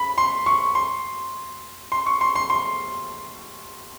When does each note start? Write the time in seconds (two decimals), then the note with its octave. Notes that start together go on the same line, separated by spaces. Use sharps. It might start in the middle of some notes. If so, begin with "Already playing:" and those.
Already playing: B5
0.18 C6
0.46 C#6
0.75 C6
1.92 C6
2.06 C#6
2.21 C6
2.36 C6
2.50 C6